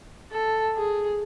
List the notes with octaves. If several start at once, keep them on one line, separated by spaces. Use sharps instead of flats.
A4
G#4